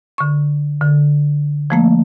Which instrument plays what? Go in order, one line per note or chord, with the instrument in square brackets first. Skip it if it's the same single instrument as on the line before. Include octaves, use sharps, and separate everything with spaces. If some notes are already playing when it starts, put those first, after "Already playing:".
[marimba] D3 C#6
D3
F3 A3 A#3